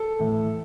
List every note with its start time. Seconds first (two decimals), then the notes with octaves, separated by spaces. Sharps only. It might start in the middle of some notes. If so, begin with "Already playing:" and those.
Already playing: A4
0.19 A2 E3